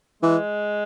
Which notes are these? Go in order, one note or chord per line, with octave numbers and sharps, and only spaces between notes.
E3 G#3